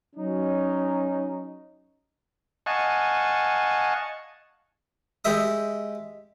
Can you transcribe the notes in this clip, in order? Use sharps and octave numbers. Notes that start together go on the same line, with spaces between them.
F#3 C#4 D#4
D#5 F5 F#5 G#5 A5 C#6
G#3 G4 D#5 E5 D#6